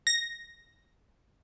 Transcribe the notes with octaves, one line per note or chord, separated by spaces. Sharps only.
A#6